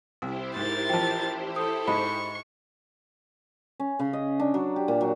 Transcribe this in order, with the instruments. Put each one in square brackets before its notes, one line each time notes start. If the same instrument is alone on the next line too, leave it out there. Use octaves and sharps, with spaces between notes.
[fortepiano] C2 [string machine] E4 G4 C5
[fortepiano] G#2 [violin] A#4 A6
[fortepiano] A1 F3 [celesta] G5 A5
[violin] A4 [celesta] D#6
[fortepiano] G#2 D#5 [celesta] B5 [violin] C#6
[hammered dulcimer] C#4
C#3
D#5
D4
F#3
G4
A#2
F#3